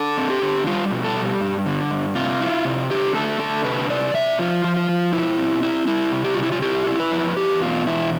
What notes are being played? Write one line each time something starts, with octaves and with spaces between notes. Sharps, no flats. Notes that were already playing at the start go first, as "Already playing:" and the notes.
Already playing: D4 A4
C4
G4
D3
G3 F4
B2
A4
G3
G2
D3
G2
C3 F4
E4
C3
D3 G4
A3 A4
D3 A4
C3 B4
C3 D5
C3 E5
F3 F4
F3
F4
F3
B2 E4
C4
E4
G3 E4
C3
G4
F4
C3
E4
F4
E4 G4
E4
B4
F2
E2 G4
B2 F4
E2 E4